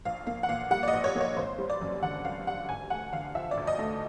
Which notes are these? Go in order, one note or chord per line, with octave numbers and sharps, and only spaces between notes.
A#1 F5
A#3 F5
F#5
A#2 F5
G3 F#5
D5
D#5
A#1
C#5
A#3
C#5
G#1 C5
G3
D5
F#2
D3 F#5
G#1 F5
G3 F#5
D2 G#5
A3 F#5
D3 F5
F3 E5
D5
D2
D#5
A3